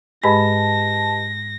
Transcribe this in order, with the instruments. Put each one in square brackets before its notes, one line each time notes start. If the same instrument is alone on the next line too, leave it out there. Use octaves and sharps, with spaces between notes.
[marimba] G#2 G#3 B5 [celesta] G4 B4 D#5 [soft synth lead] A5 [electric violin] A#6